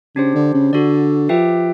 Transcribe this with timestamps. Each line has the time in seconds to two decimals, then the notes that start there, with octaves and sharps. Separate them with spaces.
0.16 C#3 D4 G4 C5
0.35 D3
0.54 C#3
0.73 D3 F#4 A4 D5
1.29 F3 G4 B4 E5 G5